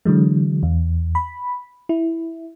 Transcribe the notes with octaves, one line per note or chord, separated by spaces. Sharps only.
D3 E3 F#3 G#3
E2
B5
E4